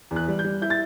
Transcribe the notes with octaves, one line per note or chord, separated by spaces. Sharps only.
E2
F#6
G3
G6
G3
E4 G6
A6